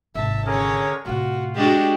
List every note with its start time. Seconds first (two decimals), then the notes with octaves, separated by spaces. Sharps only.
0.15 G#1 C3 E5 A5
0.46 D3 C#4 G#4 A#4 C#5
1.06 A2 C3 F4 F#4
1.55 G#3 D4 F#4 G4